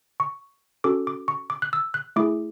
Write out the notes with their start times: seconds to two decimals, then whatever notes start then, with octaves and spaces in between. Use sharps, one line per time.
0.20 C#6
0.84 C#4 F#4 A4 D6
1.07 D6
1.28 C#6
1.50 D6
1.62 F#6
1.73 E6
1.94 F#6
2.16 A3 E4 G#4 D6